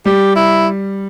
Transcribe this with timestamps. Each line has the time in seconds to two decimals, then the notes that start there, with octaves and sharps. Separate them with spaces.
0.05 G3 G4
0.36 E4